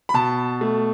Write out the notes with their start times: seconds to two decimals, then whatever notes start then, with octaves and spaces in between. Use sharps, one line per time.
0.09 B5
0.14 B2 A5
0.61 A3